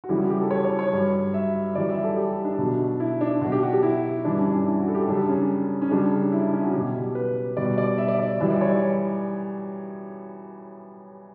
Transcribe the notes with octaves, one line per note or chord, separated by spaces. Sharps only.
F#4
F#2 C#3 E3 G3 E4
F#4
G4
A4
C#5
C#5
C#5
G2 F#3
E5
F#2 E3 G3 D5
E5
A4
G4
D4
B2 F#3
E4
D4
B2 F#3 F#4
G4
F#4
G4
E4
G2 E3 G3 D4
C#4
D4
E4
F#4
A4
G4
F#2 C#3 G3 D4
C#4
C#4
F#2 C#3 G3 D4
E4
D4
C#4
F#4
B2 F#3 G4
B4
B2 G3 D5
D5
E5
D5
D5
F#2 E3 G3 E5
D5
C#5
D5